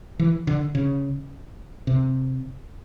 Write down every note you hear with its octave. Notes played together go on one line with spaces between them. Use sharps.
E3
D3
C#3
C3